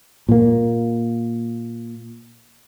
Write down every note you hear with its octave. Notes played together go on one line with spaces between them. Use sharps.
A#2 A#3